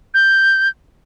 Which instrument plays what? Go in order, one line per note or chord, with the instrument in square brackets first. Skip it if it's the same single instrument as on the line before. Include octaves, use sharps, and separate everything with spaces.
[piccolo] G6